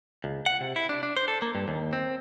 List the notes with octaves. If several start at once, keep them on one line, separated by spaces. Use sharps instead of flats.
C#2
F#5
C3
E4
D4
D4
C5
A4
A#3
G2
D#2
C4